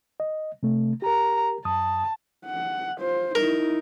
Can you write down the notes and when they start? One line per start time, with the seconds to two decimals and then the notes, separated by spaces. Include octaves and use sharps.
0.20 D#5
0.63 C3 A3
1.02 G4 A#4 A#5
1.65 F#2 A5 D#6
2.46 F#5
2.99 F4 C5
3.35 D#4 E4 A#4